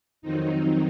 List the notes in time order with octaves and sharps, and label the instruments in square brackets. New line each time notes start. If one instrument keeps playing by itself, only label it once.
[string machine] F2 D#3 F#3 C4 D#4